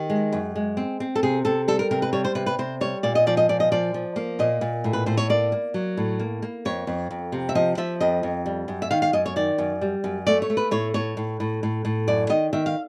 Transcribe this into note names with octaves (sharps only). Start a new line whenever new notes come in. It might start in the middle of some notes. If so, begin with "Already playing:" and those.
Already playing: D#3 G4
G#3
F#2
G#3
C4
C4
A4
C3 G#4
C3 A4
G3 A4
A#4
C3 A#4
B4
G3 C#5
C5
C3 B4
B4
C3 C5
G3 C#5
A#2 D5
D#5
F3 D5
D#5
A#2 D5
D#5
F3 D5
F3
A#3
A#2 D#5
A#2
A2
B4
A2 C5
C#5
A#3 D5
A#3
F#3
A2
A#3
A#3
F2 C#5
F2
F2
C3
E5
F3 D#5
F3 E5
F2 D#5
F2
G3
F#2
E5
D#3 F5
F5
F#2 D#5
C#5
D#3 D5
F#2
G3
F#2
A3 D5
C#5
A3
B4
A2 C#5
A2 C#5
A2
A2
A2
A2
F#2 D5
D#3 D#5
D#3 E5
F5